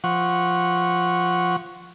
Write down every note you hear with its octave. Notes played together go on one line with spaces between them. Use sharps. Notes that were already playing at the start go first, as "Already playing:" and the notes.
F3 F#5 C#6